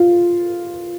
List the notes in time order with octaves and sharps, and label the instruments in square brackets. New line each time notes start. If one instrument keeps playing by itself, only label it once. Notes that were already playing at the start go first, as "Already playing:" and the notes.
Already playing: [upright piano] F4